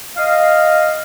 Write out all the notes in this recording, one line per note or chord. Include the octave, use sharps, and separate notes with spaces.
D#5 F5